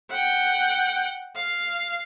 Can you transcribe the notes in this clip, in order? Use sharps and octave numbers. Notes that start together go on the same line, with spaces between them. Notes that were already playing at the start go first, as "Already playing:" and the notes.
F#5 G5
F5